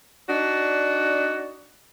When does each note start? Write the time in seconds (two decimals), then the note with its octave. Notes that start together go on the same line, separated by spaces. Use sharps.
0.29 D4 D#4 F#4 D5